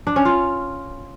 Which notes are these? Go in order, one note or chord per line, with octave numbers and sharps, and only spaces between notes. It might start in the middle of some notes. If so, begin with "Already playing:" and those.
D4
C#4
F4